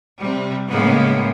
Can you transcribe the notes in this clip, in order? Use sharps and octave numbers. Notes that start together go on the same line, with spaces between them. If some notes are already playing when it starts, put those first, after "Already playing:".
C3 G3
A2 C#3 G#3 A#3 B3